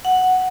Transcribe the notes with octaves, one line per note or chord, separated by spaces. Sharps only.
F#5